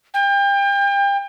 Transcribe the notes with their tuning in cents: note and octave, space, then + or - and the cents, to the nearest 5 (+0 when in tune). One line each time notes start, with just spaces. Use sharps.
G5 +35